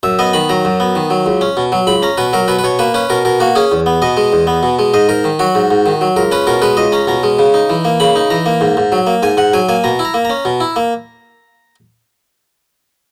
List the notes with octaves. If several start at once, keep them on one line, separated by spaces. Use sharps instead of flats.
F#2 E5
B3 D#5
D#3 B5
F#3 A#5
F#2
B3
D#3
F#3
C#2
C#4
B2
F#3
C#2 B5
C#4 A#5
B2 B4
F#3 A#4
B2 B4
B4
B2 C#5
A#3 B4
C#4 B4
B2 A#4
B2 A#4
A#3 F#4
C#4 G#4
E2
B3
B2 D#5
G#3
E2
B3
B2
G#3
G#2 D#5
G#2 A#4
D#3
F#3 F#4
G#2
G#2
D#3
F#3
C#2 A#4
C#4 B4
B2 A#4
G#3 B4
C#2 D#5
C#4 A#5
B2 A#5
G#3
C#3
D#4
E3
A#3
C#3 B5
D#4
E3 A#5
A#3
G#2
G#2
F#3
A#3
G#2 G#5
G#2 F#5
F#3 G#5
A#3 G#5
B2 A#5
E4
A#5
A#3
C#4 A#5
B2
E4
A#3